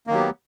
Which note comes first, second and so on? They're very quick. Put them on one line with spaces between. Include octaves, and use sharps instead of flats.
A#3 D#3 F#3 G4 B3